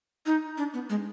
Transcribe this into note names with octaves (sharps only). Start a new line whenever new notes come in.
D#4
D4
B3
G#3